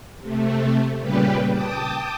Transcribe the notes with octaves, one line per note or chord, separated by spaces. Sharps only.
C3 A3
A#2 C#3 G3 G4 B4
G5 A5 D6 D#6